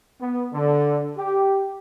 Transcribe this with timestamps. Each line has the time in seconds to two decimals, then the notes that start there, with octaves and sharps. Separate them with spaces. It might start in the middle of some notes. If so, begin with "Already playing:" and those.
0.21 B3
0.53 D3
1.17 G4